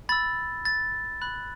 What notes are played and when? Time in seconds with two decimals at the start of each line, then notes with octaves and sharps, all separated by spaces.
0.09 B5 E6 A6
0.65 A6
1.22 B5 F#6